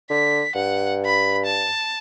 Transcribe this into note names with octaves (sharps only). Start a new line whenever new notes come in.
D3 B6
G2 F#5
B5
A5